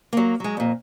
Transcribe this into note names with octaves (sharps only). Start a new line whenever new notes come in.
F#3 A#3
F#3 G#3
F2 A#2